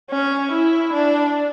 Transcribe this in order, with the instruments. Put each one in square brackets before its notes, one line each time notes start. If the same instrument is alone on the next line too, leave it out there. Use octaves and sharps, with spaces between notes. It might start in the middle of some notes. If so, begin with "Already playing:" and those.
[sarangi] C#4
E4
D4